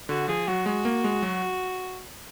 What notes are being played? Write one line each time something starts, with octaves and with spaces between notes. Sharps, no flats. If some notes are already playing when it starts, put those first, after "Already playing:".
D3 F#4
F3 G#4
F#3 F#4
G#3 F#4
A#3
G#3
F#3